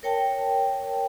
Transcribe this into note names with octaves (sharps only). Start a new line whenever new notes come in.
A#4 C#5 G5 A5